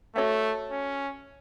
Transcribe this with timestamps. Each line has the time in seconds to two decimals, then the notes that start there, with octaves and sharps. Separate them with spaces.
0.15 A3 F#4 A4 C#5 E5
0.71 C#4